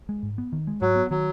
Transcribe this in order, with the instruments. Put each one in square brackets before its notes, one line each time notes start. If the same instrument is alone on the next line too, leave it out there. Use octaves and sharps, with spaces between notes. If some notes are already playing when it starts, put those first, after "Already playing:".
[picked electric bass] G#3
G#2
B3
D#3
G#3
[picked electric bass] G#2 [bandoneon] F#3
[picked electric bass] B3
[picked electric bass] D#3 [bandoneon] F#3